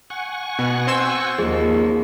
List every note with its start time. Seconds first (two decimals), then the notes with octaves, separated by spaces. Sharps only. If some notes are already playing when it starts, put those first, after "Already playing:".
0.10 F#5 G#5 C#6
0.59 B2
0.87 C4 C5 E6
1.38 D#2 F3 G#4